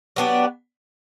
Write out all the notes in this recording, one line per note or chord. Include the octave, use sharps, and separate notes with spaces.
F#3 B3 D4 G4